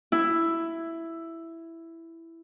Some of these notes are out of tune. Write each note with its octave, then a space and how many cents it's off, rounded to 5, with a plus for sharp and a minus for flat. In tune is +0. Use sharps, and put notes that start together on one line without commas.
E4 +5